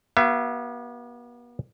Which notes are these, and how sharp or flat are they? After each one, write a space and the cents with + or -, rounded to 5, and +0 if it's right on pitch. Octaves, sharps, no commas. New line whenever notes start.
B3 -40 F#4 +40 E5 +40